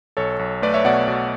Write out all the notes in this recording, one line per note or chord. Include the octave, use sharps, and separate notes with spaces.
B1 A4 C#5
B1
A3 B4 D5
C#5 E5
B2 D5 F#5
B2